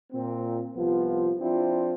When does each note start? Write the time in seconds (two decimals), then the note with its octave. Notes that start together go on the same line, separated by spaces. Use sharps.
0.13 A#2 C4
0.75 C2 F3 B3 F4
1.39 F3 C4 D4 E4 F4